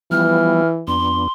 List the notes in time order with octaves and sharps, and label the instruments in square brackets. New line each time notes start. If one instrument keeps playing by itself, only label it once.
[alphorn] E3 [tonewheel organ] F3 G3 B3 [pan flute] F6
[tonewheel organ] F2 B3 D4 [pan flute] C6